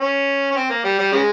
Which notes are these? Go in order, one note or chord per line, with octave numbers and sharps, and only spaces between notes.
C#4
C#4
C4
A#3
G3
G3
C#3 G#3